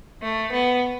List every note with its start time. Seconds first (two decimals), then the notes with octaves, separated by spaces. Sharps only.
0.22 A3
0.52 B3